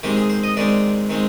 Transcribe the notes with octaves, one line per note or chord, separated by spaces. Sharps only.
D#3 G#3 C4 G4
G#4
C5
D#5
D#3 G#3 C4 D5
D#3 G#3 C4